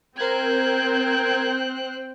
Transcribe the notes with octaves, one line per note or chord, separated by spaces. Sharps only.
C4 A#4 C5 G5 F#6 G#6